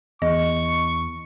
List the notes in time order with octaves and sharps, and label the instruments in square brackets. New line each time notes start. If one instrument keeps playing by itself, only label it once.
[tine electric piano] E2 [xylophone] D#5 [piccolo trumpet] C#6